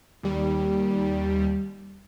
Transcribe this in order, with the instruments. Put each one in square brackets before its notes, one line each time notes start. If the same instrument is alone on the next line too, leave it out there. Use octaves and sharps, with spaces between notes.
[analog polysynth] D#2 G3